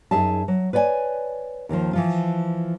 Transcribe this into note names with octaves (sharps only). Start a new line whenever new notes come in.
F#2 D#4 G#4 E5 A5
F#3
B4 C#5 D5 G5 G#5
D#2 D3 D#3 F3
E3 F3 F4